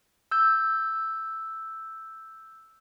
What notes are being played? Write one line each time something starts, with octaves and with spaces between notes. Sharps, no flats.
E6 G6